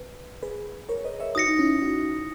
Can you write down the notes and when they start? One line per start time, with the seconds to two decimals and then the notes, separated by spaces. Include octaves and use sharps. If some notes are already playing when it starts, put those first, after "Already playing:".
Already playing: B4
0.43 G#4 B4
0.89 A#4 C#5
1.05 B4 D#5
1.20 C#5 E5
1.35 D#4 F#4 D#6 A#6 C#7
1.48 D#4
1.59 C#4 E4
1.82 D#4 F#4